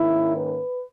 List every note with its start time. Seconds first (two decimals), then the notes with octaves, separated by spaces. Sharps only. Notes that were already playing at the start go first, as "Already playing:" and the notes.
Already playing: G#2 D#3 A#3 C#4 E4
0.34 B4